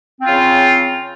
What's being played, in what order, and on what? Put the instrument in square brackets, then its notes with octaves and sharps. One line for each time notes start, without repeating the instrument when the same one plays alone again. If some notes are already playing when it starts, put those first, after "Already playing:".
[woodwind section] C4
F4
C#3